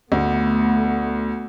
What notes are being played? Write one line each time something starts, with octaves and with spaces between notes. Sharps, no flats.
D2 A3 B3